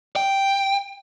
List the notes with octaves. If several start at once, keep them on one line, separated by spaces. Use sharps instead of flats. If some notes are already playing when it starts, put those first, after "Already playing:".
G5